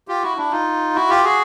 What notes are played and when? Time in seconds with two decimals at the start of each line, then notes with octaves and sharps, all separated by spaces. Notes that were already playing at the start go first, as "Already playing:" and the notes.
0.08 F4 G4
0.23 E4 F#4
0.37 D4 E4
0.51 D#4 F4
0.95 E4 F#4
1.09 F4 G4
1.24 F#4 G#4